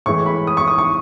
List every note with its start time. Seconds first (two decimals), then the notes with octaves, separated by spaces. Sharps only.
0.06 A2 E3 G#3 C#6
0.26 B5
0.47 D#6
0.57 C#6
0.68 D#6
0.78 C#6